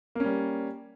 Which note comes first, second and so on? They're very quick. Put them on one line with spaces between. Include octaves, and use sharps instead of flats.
A#3 C#4 G3